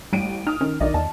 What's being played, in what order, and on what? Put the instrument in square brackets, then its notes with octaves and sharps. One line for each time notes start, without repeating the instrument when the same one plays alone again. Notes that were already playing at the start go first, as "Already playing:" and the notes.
[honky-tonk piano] A1 D7 D#7 [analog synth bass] G3
[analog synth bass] D#4 [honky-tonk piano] D#6 F6
[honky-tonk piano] D#3 [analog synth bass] C#4
[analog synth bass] B1 [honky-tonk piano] D#3 D5 D#5
[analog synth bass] E2 [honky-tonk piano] A5